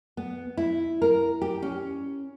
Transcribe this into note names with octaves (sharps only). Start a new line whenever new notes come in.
B3
E4
A#4
G4
C#4